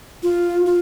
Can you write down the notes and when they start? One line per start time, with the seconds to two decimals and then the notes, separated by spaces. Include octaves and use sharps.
0.23 F4
0.65 F4